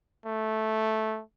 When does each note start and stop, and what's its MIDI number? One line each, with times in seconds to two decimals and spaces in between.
0.26 1.21 57